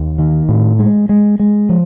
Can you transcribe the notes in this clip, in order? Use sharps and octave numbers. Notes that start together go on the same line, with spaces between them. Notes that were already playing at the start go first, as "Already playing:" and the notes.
Already playing: D#2
D#3
A2
G#3
G#3
G#3
F3